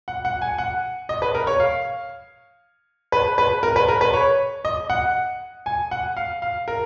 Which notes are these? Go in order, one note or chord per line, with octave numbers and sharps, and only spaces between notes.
F#5
F#5
G#5
F#5
D#5
B4
A#4
C#5
F5
B4
B4
A#4
B4
A#4
B4
C#5
D#5
F#5
G#5
F#5
F5
F5
A#4